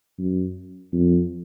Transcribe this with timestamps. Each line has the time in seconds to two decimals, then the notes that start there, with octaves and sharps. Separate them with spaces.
0.19 F#2
0.92 F2